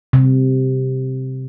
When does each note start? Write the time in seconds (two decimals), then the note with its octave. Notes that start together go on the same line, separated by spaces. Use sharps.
0.13 C3